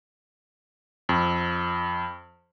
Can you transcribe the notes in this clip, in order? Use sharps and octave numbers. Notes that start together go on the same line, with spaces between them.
F2